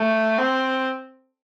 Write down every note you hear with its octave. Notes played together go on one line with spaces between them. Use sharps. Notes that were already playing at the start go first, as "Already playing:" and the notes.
Already playing: A3
C4